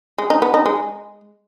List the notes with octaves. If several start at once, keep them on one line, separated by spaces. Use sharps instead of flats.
G#3
D#4
B3
D#4
G#3